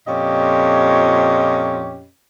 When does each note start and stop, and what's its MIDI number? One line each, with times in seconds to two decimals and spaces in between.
0.08 2.07 41
0.08 2.07 46
0.08 2.07 61
0.08 2.07 67
0.08 2.07 75